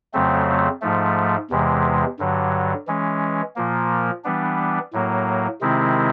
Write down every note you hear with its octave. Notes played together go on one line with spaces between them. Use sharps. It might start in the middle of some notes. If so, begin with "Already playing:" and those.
F2 C#3 F#3 A3 C4
G#2 F3 A3
E2 C3 E3 G#3
G2 D3 F#3
E3 G#3 C#4
A#2 F3 A#3
E3 G3 B3 D4
A2 F#3 A#3
C3 D#3 G#3 C4 E4